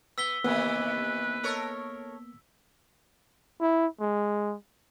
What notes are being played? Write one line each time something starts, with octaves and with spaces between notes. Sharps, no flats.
B3 E6 B6 G7
C3 D#3 E3 A#3 B3 B4
A4 A#4 C#5
E4
G#3